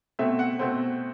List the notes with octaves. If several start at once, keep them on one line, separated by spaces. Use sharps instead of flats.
B2 A3 C4 E5
F#5
B2 A3 C4 C5